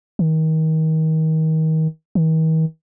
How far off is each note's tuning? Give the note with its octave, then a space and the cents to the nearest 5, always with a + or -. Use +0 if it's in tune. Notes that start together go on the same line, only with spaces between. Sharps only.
D#3 +30
D#3 +45